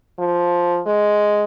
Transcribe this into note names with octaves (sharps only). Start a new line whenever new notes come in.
F3
G#3